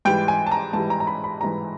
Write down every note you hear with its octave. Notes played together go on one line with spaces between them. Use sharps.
G#2 E3 G3 G5
G#5
A5
A#5
G#2 E3 G3 A5
A#5
A#5
B5
B5
G#2 E3 G3 A#5